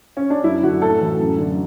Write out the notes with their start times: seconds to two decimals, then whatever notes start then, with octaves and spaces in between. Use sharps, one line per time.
0.17 C#4
0.30 D4
0.44 F#2 E4
0.63 D3 F#4
0.82 A2 A4
1.00 E3
1.19 F#2
1.39 D3